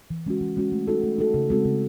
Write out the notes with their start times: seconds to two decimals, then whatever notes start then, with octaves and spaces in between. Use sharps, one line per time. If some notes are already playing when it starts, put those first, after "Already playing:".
0.10 E3
0.26 G#3 C#4 F#4
0.41 E3
0.57 G#3 C#4 F#4
0.72 A3
0.88 D#4 F#4 A4
1.03 A3
1.18 D#4 F#4 A4
1.34 C#3
1.50 G#3 C4 F#4 A4
1.65 C#3